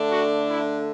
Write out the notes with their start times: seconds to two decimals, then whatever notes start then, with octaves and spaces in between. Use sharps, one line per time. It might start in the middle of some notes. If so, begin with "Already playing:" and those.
Already playing: D3 A3 D4
0.11 F#4
0.49 E4